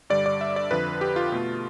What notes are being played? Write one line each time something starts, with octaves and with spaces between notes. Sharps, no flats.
G2 D3 G3 D5
D5
E5
D5
F2 D3 F3 B4
G4
F4
B2 A3